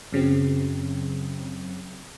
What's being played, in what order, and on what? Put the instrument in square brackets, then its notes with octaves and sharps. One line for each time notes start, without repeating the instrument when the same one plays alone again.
[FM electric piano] F#2 C#3 F#3 C4